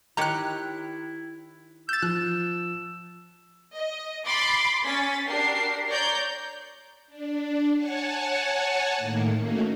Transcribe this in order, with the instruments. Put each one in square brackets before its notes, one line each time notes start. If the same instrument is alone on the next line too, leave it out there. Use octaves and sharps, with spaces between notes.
[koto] D#3 G4 C#5 [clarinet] E4 [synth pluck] A#5 F#6
[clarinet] E6 [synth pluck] G6 A6
[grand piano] F3 [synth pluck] F#6
[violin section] D#5
B5 C6 D6 A6
C#4 A6 B6
D4 F#4 G4 A#4 C7
C#5 D5 A#5 G6
[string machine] D4
C#5 F#5 G#5 A5 C#6
A2 D#3 A#3
A3 A#3 C#4 D#4 F#4